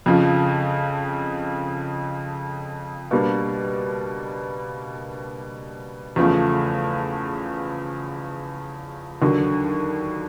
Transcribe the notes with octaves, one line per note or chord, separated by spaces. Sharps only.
F2 C#3 F3
B2 G3 A#3 D4
E2 C#3 F3 A3
D#2 D3 F#3